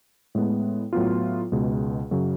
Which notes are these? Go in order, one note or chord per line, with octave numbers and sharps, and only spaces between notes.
A2 G#3 B3
A2 F#3 B3 F4
C#2 B2 G#3
F#2 C#3 F#3